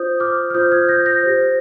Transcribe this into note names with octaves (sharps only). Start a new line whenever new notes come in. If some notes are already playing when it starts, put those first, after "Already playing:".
Already playing: F4 C5 D#6 G6
D6 F6
F6
F4 C5 D#6 G6
F6 G#6
G6 A#6
G6 A#6
G4 C5